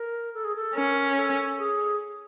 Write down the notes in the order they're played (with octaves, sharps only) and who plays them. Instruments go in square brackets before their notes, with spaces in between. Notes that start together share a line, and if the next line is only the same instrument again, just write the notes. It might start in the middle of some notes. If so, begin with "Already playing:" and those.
Already playing: [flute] A#4
A4
G#4
A4
[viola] C#4 [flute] A#4
[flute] A4
G#4